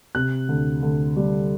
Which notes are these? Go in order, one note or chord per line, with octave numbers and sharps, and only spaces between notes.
C3 F#6
D2
D2
G3